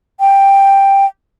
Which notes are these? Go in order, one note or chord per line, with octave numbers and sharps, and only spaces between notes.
G5